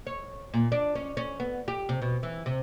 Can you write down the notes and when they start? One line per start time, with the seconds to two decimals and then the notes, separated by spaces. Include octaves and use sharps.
0.07 C#5
0.54 A#2
0.72 D4
0.95 C#4
1.17 C#4
1.40 B3
1.68 G4
1.89 C3
2.02 B2
2.23 E3
2.46 C3